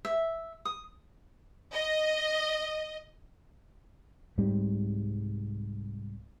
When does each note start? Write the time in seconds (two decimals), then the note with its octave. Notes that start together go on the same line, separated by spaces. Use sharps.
0.05 E5
0.65 D#6
1.74 D#5
4.38 C2 G#2 C3 G3